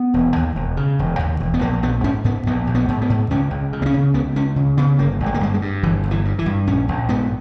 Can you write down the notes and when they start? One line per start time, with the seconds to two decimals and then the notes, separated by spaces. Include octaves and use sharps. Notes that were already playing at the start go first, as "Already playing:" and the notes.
Already playing: B3
0.14 E1
0.36 D#2
0.56 E1
0.77 C#3
0.99 E1
1.19 D#2
1.40 E1
1.54 B3
1.61 A#1 A#3
1.82 A#1 B3
2.04 G#2 C#4
2.24 G#2 B3
2.46 A#1 B3
2.67 A#1
2.75 B3
2.88 G#2
3.02 B3
3.10 G#2
3.30 C#2 C#4
3.51 C#2
3.73 C#3
3.82 B3
3.86 C#4
3.94 C#3
4.14 C#2 B3
4.36 C#2 C#4
4.56 C#3
4.77 C#3 B3
4.98 G1 A#3
5.20 G1
5.26 G#3
5.34 A#3
5.41 G2 G#3
5.54 G#3
5.62 G2
5.83 G1 E3
6.03 G1
6.11 E3
6.25 G2
6.39 E3
6.46 G2
6.67 A#1 C#4
6.88 A#1
7.09 G#2 B3